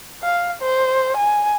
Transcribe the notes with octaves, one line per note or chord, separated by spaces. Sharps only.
F5
C5
G#5